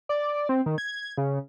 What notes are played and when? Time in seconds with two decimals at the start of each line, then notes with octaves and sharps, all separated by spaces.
0.09 D5
0.49 C4
0.66 D#3
0.78 G#6
1.17 C#3